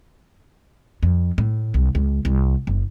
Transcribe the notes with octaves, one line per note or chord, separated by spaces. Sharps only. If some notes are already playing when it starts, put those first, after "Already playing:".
F2
A2
C2
C#2
C2
F#1